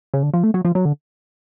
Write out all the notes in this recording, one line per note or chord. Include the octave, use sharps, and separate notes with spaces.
C#3
D3
F3
A3
F#3
F3
F#3
D3